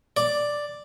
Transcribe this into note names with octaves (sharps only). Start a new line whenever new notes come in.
D5